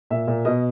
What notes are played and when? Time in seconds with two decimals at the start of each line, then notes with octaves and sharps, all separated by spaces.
0.10 A#2 E5
0.27 A#2
0.45 B2 D#5